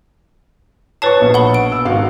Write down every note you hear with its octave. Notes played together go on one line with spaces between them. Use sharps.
B4 C#5 A5 C#6 A6 C7
A#1 B2
F#5 B5 G7
D7
E6
G#1 F#4 F5